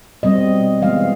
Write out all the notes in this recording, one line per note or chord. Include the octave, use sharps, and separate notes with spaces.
B2 G3 C4 D#5
E3 G#3 B3 F5